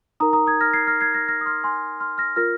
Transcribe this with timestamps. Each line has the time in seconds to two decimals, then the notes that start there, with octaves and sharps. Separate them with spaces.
0.20 D#4 A#4 A#5 D#6
0.33 A#5 D#6
0.47 D#6 G#6
0.61 F6 A#6
0.73 G#6 C7
0.87 F6 A#6
1.01 G#6 C7
1.14 F6 A#6
1.28 F6 A#6
1.41 D#6
1.46 C6 F6
1.64 G#5 C6
2.00 C6 F6
2.18 F6 A#6
2.36 F4 A#4 F6 A#6